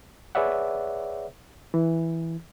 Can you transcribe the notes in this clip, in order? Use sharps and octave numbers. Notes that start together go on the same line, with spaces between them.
G#4 B4 C#5 D5 E5 F#5
E3